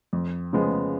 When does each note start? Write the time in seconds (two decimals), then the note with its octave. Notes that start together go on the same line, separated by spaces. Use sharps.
0.13 F2
0.53 C#3 F3 G#3 B3